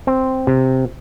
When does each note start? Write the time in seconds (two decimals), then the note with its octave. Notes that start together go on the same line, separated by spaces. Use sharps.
0.07 C4
0.47 C3